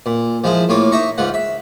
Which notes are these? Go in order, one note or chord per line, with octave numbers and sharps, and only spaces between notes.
A#2
F3 G#3 E4
A2 A#3 F4 C#5 D6
D#4 E5 A#5 C#6
C#2 G#2 F4 F#5
E5